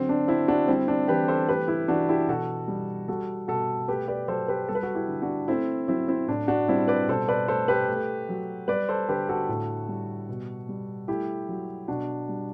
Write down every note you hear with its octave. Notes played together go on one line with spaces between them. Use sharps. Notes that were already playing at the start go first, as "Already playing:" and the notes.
Already playing: D3 F#3 C4
D4
D3 C4 E4
D4 F#4
G3 C4 E4
D4
E3 G4 B4
A4 C5
A3 G4 B4
E4 G4
E3 D4 F#4
E4 G4
B2 F#4 A4
G3
G3 F#4 A4
B2 F#4 A4
A3 G4 B4
B4 D5
F#3 A4 C5
G4 B4
G3 A4
B4
F#4 A4
E4 G4
D3
D4 F#4
A3 C4 E4
F#3 C4 E4
C4 E4
A2 D4
D4 F#4
G3 C4 E4
B4 D5
B2 A4 C5
B4 D5
A3 A4 C5
G4 B4
A3
F#3
G3 B4 D5
A4 C5
D3 G4 B4
F#4 A4
A2
G3
B2
G3
A3 E4 G4
F#3
B2 D4 F#4
G3